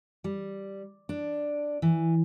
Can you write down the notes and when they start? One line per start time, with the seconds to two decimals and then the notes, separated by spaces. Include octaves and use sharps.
0.24 G3
1.09 D4
1.82 E3